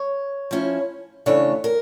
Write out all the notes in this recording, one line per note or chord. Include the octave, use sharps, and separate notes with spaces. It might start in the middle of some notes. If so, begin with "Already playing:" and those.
Already playing: C#5
F3 C#4 E4
C#3 E3 A3 D4 C#5
A#4